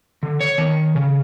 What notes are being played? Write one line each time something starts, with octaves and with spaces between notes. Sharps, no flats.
D3
C#5
D#3
C#3